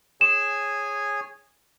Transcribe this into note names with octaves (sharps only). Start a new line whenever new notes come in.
G#4 C#5 G#5 E7